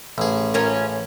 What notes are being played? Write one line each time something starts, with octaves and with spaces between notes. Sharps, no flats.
A1 G#4
C#4 F4 A#4